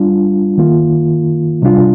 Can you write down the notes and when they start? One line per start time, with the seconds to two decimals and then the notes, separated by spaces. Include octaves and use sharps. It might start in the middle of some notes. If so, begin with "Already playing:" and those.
Already playing: G3 D4 F4
0.58 D#3 A#3 F4
1.62 C3 G3 D4 F4